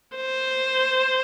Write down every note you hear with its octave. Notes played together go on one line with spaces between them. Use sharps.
C5